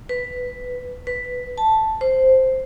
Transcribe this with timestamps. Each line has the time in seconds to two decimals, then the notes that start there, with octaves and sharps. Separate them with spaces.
0.09 B4
1.07 B4
1.58 A5
2.01 C5